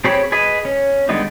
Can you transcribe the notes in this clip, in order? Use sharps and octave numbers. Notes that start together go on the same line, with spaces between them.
C4 G4 G#4 C#5 B5
G#4 B4 D#5
C#4
D3 G3 G#3 B3 D#4